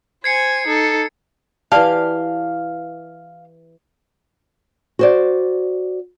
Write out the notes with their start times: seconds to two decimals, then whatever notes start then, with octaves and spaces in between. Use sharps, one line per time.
0.24 C5 G#5 G#6 C7 C#7
0.67 D#4 A4
1.72 E3 G4 D5 F5 A5
4.99 F#4 C5 D5